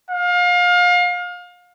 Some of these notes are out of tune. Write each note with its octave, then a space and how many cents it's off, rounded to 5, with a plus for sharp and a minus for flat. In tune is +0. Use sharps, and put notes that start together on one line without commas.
F5 +30